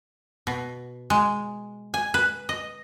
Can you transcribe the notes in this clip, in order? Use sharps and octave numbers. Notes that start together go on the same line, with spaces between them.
B2
G#3
G#5
B4
D#5